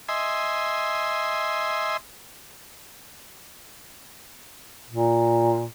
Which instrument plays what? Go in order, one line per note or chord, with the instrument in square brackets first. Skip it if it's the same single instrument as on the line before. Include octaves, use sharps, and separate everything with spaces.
[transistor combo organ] D#5 E5 G#5 C6
[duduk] A#2